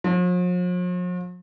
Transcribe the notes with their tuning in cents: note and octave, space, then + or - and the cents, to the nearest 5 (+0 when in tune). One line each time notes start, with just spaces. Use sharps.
F3 +45